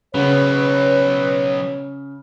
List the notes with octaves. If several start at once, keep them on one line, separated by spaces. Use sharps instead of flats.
C#3 F#3 B3 B4 C#5